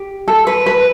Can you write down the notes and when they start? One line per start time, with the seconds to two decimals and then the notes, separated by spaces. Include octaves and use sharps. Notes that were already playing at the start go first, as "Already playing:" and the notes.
Already playing: G4
0.28 A4
0.47 B4
0.66 B4